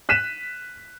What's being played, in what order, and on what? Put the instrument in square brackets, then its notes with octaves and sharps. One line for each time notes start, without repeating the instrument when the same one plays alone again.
[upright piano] F#6 B6 D#7 E7